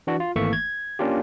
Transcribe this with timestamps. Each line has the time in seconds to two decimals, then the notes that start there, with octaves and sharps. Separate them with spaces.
0.07 E3 D4 F#4
0.20 F4
0.36 G#1 E3 A3 A#3 E5 C#6
0.53 G#6
0.99 A#3 C#4 D4 F4 G4